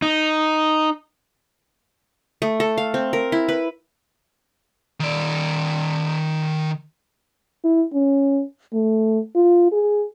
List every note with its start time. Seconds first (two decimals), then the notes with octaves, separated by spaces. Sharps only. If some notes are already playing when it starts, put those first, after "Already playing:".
0.02 D#4
2.42 A3
2.60 A4
2.78 F5
2.94 C4
3.13 A#4
3.32 E4
3.48 B4
5.00 D#3 D5
7.64 E4
7.93 C#4
8.73 A3
9.36 F4
9.72 G#4